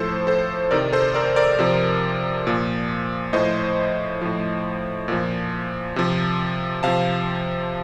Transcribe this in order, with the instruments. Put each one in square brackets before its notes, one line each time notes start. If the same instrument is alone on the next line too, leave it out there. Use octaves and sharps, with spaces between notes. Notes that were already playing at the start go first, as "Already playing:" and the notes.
Already playing: [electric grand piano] A2 F3 A4 C5
A4 C5
C3 D#3 A#4 D5
A4 C5
A#4 D5
A#4 D5
C3 F3
A#2 F3
A2 F3 C5 D#5
A2 F3
A#2 F3
C3 F3
C3 F3 F5 A5